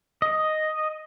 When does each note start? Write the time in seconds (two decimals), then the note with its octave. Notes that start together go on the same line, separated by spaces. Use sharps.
0.22 D#5